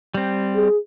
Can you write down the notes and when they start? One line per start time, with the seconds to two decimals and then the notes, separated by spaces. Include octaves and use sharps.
0.14 G3 C4
0.55 G#4